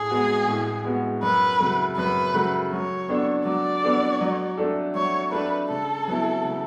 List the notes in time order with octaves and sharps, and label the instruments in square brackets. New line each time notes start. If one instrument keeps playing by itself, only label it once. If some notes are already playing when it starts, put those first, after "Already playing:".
Already playing: [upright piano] A2 [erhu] G#4
[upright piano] G#3 B3 F#4
A2
G#3 B3 F#4
[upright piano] F#2 [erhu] B4
[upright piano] C#3 F#3 A3
[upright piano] F#2 [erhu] B4
[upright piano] C#3 F#3 A3
[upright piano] F#3 [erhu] C#5
[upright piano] B3 D4 A4
[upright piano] F#3 [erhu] D5
[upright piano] B3 D4 A4
F#3
A3 D4 A4
[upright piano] F#3 [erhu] C#5
[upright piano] A3 D4 A4 [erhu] B4
[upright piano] C#3 [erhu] A4
[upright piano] F#3 B3 E4
C#3